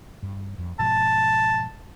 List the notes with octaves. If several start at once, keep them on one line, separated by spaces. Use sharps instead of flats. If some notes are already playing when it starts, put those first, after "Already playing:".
G2
F2
G#2 B2 F3 A5